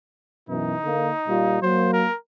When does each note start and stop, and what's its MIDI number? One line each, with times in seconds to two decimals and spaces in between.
0.49 0.74 42
0.49 0.74 47
0.49 0.74 52
0.49 1.61 63
0.83 1.11 50
0.83 1.11 58
1.27 1.57 46
1.27 1.57 55
1.27 1.57 65
1.62 2.05 54
1.62 2.05 58
1.62 1.92 72
1.93 2.17 70